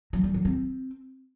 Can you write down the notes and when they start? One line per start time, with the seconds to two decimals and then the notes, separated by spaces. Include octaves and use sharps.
0.13 F#3
0.24 G3
0.34 F#3
0.45 C4